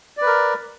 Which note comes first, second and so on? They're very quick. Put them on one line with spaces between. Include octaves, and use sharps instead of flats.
D5 B4 A#4